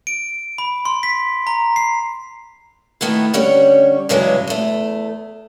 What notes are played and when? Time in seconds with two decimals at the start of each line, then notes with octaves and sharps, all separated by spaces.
0.07 D7
0.58 B5
0.85 C6
1.03 B6
1.47 A#5
1.76 C7
3.01 D#3 A3 B3 E4
3.34 D3 G3 C#4 C#5
4.09 G2 C#3 E3 F#3 G#3
4.47 E2 A3